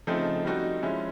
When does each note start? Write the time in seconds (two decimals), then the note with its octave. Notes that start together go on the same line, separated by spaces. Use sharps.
0.07 C#3 F3 A3 C4 D#4
0.45 G3 C4 D#4 F#4
0.83 F3 G#3 C#4 E4